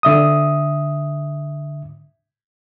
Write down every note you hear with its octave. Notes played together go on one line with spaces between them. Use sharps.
D3 E5 D#6